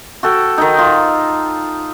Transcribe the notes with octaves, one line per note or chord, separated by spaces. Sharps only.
F#4 A4 G5
D#3 D#4
F4